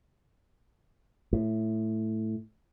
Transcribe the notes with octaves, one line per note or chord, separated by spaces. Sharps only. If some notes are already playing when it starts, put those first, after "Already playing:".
A2